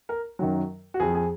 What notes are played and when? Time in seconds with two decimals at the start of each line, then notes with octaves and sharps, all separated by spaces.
0.09 A#4
0.39 F#2 D#3 F#3
0.94 F#4
1.00 F2 F3 G#4
1.15 G#4